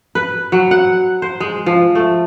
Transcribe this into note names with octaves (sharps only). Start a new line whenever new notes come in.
B4
F#3
F#5
C5
G#3
F3
A3